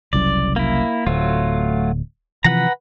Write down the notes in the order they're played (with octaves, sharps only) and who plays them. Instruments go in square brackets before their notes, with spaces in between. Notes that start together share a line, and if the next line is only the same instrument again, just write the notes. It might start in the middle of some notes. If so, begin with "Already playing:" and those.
[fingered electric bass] F#1 C2 F#2 [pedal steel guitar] D5
[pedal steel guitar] A#3 E4
[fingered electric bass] D1 [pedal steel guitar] F#3 A3 F4
[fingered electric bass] C3 E3 F3 [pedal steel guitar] B4 F#5 A#5